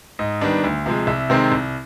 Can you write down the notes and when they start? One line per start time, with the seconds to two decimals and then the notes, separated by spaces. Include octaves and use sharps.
0.19 G#2 D#5
0.41 D#3 G3 B3 D4
0.64 D2
0.86 C3 F3 G#3
1.07 C2 E5
1.30 C3 D#3 G#3 C4
1.52 C2